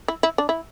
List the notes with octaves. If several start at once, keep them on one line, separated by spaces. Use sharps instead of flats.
E4
E4
D4
E4